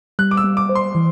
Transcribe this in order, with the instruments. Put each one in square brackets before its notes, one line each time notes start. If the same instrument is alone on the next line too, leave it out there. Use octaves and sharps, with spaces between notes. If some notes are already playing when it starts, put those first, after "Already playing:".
[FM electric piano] G3 [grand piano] F#6
[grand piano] D6
E6
[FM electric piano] G3
[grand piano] D6
[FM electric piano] C5
[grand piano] C6
[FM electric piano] E3